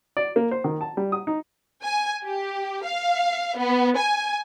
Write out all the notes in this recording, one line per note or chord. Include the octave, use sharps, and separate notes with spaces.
D5
A#3
C5
D#3
A5
G3
D#6
D#4
G#5
G4
F5
B3
G#5